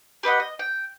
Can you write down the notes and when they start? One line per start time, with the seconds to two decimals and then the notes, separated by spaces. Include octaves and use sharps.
0.23 G4 B4 D#5 F#5
0.40 D#5
0.59 G5